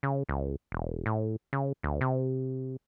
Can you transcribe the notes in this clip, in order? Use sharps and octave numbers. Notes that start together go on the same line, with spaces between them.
C#3
C#2
E1
A2
C#3
D2
C3